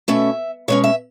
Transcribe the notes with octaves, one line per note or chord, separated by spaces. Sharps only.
B2 A3 C#4 E5
B2 G#3 C#4 C#5
E5